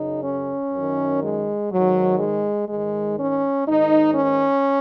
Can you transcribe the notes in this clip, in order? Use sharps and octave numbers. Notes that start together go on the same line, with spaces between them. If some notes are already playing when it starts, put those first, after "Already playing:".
Already playing: F#2 C#3 D#4
C#4
F#2 D#3
G#3
G#2 D#3 F#3
G#3
G#2 D#3 G#3
C#4
G#2 D#3 D#4
C#4